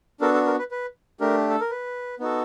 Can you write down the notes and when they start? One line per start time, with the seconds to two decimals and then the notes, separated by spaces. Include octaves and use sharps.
0.20 B3 D4 F#4 A4 A#4
0.34 A4
0.46 A#4
0.59 B4
0.71 B4
1.20 A3 D4 G4 A#4
1.50 A4
1.61 A#4
1.70 B4
2.19 B3 D#4 F#4 A4